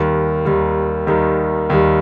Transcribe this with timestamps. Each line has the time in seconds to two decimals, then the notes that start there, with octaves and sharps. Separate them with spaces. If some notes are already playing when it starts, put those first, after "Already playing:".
Already playing: D#2 D#3 G3
0.45 D#2 D#3 G3
1.07 D#2 D#3 G3
1.70 D#2 D#3 G3